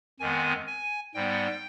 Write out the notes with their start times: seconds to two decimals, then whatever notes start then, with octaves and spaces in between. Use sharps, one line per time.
0.20 F2 D#3 G#3 B3 G#5
0.67 G#5
1.14 G#2 G3 B3 G5